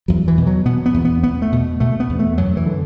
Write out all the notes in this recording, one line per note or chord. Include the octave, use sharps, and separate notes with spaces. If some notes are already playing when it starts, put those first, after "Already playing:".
E2 F#3
E3
B2
F#3
B2 B3
B3
E2
B3
E2 B3
A3
B2
B2 A3
B3
E2
A3
F#2 F#3
E3
D3